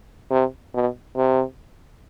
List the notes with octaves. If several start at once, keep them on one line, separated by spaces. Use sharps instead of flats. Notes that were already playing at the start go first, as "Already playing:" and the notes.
C3
B2
C3